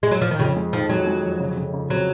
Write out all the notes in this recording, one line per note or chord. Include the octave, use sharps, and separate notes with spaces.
G#3
F#3
F3
D#3
F2 C#3
G#3
D#3 F3
F#3 G#3
G#3
F2
C#3
C#3
C#3
F#3 C4